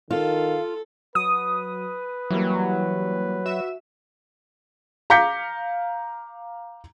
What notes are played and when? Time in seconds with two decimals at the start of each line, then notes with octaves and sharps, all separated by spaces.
0.11 D#3 F4 A4 F5
1.15 F#3 B4 D#6
2.31 E3 F#3 G3 A#3
3.46 F#4 E5 E7
5.10 F5 A#5 D6 G6 B6 C#7